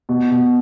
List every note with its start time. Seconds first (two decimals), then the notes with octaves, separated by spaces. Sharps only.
0.09 B2
0.31 B2